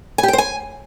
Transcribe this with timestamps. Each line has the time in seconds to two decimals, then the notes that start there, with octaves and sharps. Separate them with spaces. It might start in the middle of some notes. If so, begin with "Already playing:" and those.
0.18 G#5
0.23 G4
0.28 G5
0.33 C5
0.38 G#5